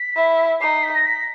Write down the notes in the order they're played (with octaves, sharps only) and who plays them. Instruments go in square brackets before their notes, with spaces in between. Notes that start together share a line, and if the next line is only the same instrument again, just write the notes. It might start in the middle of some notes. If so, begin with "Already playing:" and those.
Already playing: [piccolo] B6
[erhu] E4
[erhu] D#4 [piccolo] C7
[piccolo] B6
A#6
B6